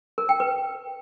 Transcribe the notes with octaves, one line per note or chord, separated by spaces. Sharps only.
A#4
G5
B4